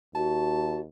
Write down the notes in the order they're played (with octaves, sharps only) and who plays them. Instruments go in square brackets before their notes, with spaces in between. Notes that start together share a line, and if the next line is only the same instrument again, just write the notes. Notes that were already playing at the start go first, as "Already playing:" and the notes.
[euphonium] D#2 [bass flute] F#4 [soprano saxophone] A5